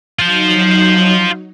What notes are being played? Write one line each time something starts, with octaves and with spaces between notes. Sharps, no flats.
F#3 D#4 F4 C5